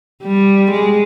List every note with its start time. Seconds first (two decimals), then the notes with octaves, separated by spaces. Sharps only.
0.24 G3
0.71 G#3